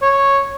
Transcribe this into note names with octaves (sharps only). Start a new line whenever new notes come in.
C#5